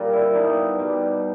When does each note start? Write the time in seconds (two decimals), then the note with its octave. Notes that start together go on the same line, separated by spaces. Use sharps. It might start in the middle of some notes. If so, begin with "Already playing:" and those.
Already playing: A#2 G3
0.13 E4
0.35 B2 G3 D#4
0.79 B2 G3